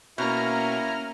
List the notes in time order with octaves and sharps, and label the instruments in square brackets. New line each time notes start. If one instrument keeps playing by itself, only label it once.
[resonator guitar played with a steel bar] B2 [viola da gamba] A#3 C#4 [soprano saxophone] E4 [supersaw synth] A#5 F6